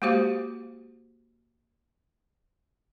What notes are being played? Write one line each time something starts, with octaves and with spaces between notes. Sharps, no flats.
G#3 A#3 F#4 G4 C5 F5